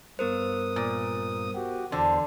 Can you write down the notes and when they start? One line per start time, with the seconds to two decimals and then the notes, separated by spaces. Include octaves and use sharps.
0.19 G2 B3 A#4 C5 D#6
0.76 A#2
1.55 F#4 G4
1.92 E2 D3 C5